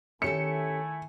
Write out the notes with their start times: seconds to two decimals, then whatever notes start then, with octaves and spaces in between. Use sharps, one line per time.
0.22 D#3 A3 C#4 E4 G4 A4 G#5 C#7